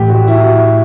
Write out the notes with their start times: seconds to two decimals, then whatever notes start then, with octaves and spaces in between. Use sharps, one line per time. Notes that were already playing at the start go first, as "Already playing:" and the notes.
Already playing: A2 E3 A3 G4
0.10 F#4
0.23 F#4
0.27 E4
0.45 F#4